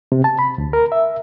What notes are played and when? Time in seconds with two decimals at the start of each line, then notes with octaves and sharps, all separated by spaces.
0.12 C3
0.24 A5
0.39 B5
0.58 D2
0.73 A#4
0.92 E5